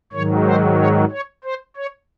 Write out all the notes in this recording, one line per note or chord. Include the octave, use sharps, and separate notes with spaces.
G#2 D#3 F#3 C#5
C5
C#5
C#5
C5
C#5